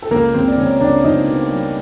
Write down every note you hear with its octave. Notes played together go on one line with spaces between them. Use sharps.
A4
C#2 A#3 A#4
C#2 C4 C5
D5
C#2 C#4 C#5
C#2 D4 D5
C#2 D#4 D#5
B2
G3